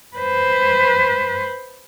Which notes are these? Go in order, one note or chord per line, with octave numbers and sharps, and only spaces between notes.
B4 C5